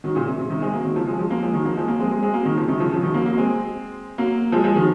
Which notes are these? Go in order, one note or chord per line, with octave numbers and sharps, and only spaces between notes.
D#3 F#3
A#2 C#3
C3
C3
C3 D#3
G#3 C4
F#3 A#3
D#3 F#3
C#3 F3
F3 G#3
F3 G#3
F#3 A#3
F3 G#3
D#3 F#3
F#3 A#3
F3 G#3
F#3 A#3
G#3 C4
G#3 C4
G#3 C4
F#3 A#3
D#3 F#3
C#3 F3
C3 D#3
C#3 F3
C#3 F3
D#3 F#3
F#3 A#3
F#3 A#3
G#3 C4
F#3 A#3
F3 G#3
F3 G#3
D#3 F#3